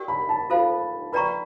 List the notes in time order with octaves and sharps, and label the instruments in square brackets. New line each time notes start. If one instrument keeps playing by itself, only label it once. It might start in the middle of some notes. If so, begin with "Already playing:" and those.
Already playing: [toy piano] G4 A#4 D5 G5
[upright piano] B5
A5
[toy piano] F4 A4 C5 F5
[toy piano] B4 D5 G5 A#5 C#6 [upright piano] B5